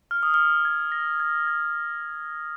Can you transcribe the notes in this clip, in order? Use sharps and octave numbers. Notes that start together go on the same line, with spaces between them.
F6
D#6
F6
G#6
A#6
G#6
G#6